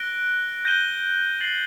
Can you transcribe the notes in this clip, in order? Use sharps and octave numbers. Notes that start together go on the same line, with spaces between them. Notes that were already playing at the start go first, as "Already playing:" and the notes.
Already playing: F#6 A#6 D7 G7
G6 A#6 D#7 G7
A6 C7 F#7